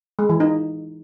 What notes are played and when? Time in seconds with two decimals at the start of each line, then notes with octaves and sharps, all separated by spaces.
0.19 G#3
0.29 E3
0.40 D#4